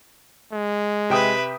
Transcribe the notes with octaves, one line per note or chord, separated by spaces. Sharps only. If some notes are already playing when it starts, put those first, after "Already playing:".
G#3
C3 B4 E5 G5 D#6